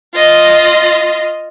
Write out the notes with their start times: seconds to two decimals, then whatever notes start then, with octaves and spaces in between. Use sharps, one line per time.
0.14 F4 D#5